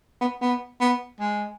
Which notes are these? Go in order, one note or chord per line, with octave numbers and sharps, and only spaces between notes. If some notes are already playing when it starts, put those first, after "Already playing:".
B3
B3
B3
G#3